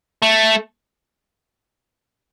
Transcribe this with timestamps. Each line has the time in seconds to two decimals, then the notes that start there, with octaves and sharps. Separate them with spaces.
0.22 A3